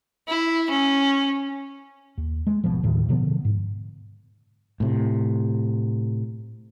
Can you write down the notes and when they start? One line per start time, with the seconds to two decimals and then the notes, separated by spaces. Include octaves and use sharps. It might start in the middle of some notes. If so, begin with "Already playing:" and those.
0.28 E4
0.70 C#4
2.18 D#2
2.47 G#3
2.64 D#1 G#1 B2 F3
2.83 D#2 A2 D#3
3.09 B2 D3 F3 B3
3.45 G#2
4.80 A2 C3